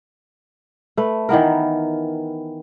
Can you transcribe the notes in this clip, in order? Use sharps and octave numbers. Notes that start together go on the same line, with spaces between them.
A3 B4
D#3 E3 B3 A#4